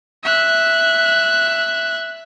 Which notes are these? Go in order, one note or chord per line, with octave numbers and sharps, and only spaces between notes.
E5 F#6